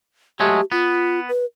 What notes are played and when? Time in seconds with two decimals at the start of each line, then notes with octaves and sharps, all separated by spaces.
0.40 F#3 G#3 A3 G4
0.72 B3 F4
1.29 B4